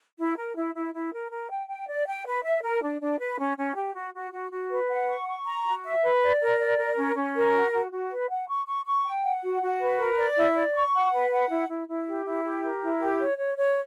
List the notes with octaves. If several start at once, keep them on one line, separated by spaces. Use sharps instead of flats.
E4
A#4
E4
E4
E4
A#4
A#4
G5
G5
D5
G5
B4
E5
A#4
D4
D4
B4
C#4
C#4
G4
F#4
F#4
F#4
F#4
B4
F#5
C#6
C#6
A#5
F#4
E5
B4
D5
A#4
D5
A#4
C#4
C#4
A#4
F#4
F#4
F#4
B4
F#5
C#6
C#6
C#6
G5
F#5
F#4
F#4
B4
A#4
D5
E4
D5
C#6
F#5
B4
F#5
E4
E4
E4
G4
E4
G4
A#4
E4
G4
C#5
C#5
C#5